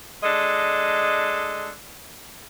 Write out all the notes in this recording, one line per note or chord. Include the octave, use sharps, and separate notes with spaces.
G#3 D4 A4 D#5